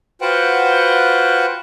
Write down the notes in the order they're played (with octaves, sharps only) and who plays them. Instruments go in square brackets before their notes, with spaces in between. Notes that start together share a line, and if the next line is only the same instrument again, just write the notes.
[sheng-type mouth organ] F4 F#4 B4 C5 F#5 G5